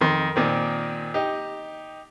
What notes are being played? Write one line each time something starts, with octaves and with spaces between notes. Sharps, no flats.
F2 D#3 C6
A#2 D#3 C4
D#4 G4